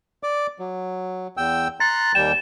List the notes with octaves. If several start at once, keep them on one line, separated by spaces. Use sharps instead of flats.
D5 D6
F#3
E2 G5 E6
A#5 C6 F#6 A6
D#2 G3 G5 E7